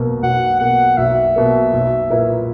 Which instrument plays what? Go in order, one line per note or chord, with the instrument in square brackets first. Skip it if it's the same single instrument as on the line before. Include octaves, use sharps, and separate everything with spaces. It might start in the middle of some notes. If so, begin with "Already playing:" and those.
Already playing: [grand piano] B1 B2 A#3
[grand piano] B1 [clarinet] F#5
[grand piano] B2 A#3 [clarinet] F#5
[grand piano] B1 [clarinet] E5
[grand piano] B2 A#3
B1
A#2 A#3 E4 B4